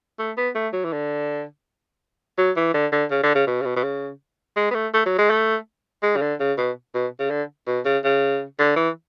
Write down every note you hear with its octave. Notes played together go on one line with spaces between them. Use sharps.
A3
B3
A3
F#3
E3
D3
F#3
E3
D3
D3
C#3
D3
C#3
B2
C#3
B2
B2
C#3
G#3
B3
A3
A3
F#3
G#3
A3
G#3
C#3
D3
C#3
B2
B2
C#3
D3
B2
C#3
C#3
D3
E3